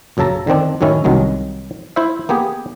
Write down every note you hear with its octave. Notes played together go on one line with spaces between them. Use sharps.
A#1 F#2 C#3 A4 A5 A#5
D3 D#3 C4 D4
F#2 A2 D#3 C#4 E4
C2 D#3 F#3 G#3 A#3
E4 C5 E5
A#3 B3 G4 G#4